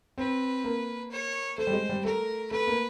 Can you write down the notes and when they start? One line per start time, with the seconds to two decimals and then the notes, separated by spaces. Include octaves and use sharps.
0.18 C4 B4
0.64 A#3
1.11 C#5
1.58 A3 C5
1.67 G3
1.73 G#3
1.89 G3
2.05 A3 A#4
2.51 A3 B4
2.67 A#3